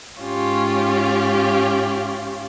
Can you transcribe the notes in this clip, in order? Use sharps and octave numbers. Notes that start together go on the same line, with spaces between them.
G#2 C#4 F4 G4